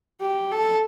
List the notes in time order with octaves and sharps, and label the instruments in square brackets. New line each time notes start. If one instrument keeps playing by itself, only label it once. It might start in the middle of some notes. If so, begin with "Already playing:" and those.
[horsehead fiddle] G4
A4